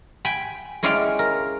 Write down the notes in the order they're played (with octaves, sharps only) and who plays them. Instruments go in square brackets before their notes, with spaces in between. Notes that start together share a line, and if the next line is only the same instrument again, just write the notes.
[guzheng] G5 G#5 B5
G#3 C#4 E4 D5 F5 G5
A#4